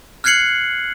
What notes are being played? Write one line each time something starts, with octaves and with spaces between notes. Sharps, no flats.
F6 F#6 G#6 C7 C#7 F#7